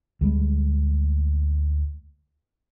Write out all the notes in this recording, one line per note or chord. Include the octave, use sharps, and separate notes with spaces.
D2 G3 G#3